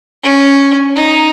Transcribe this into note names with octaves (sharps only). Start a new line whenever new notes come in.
C#4
D#4